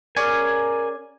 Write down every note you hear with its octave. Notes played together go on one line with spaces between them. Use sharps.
C#4 G#4 A#4 D5 G#5